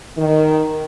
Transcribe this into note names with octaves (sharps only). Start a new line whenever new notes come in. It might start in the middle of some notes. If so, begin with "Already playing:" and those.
D#3